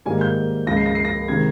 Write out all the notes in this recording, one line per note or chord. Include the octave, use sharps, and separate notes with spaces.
G#2 D#3 G3 A#3 G#5
G6
C#2 C#3 F3 G#3 A#6
C7
A#6
C7
A#6
C3 D#3 G#3 G#6